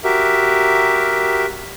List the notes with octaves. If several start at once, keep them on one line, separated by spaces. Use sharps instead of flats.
F#4 G4 A#4 E5